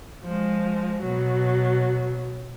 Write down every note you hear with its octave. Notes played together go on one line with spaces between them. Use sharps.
F3 G#3
B2 F#3